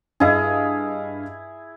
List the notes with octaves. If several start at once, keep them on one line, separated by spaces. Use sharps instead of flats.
G2 E4 G#4 D#5 F5